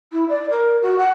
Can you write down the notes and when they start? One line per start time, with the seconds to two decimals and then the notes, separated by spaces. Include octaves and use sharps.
0.12 E4
0.29 D5
0.50 A#4
0.82 F#4
0.98 F#5